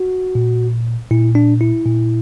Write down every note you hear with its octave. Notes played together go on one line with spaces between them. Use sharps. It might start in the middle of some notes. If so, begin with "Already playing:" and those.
Already playing: F#4
A#2
A#2 E4
D4
E4
A#2